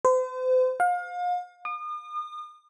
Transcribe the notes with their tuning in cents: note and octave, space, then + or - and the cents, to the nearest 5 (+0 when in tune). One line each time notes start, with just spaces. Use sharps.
C5 -40
F5 +35
D#6 -40